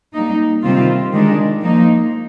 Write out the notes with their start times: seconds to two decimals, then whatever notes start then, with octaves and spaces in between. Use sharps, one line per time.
0.14 G3 A#3 D#4
0.63 C3 D#3 G3 C4 F4
1.13 D#3 G#3 D4
1.62 F3 A#3 D#4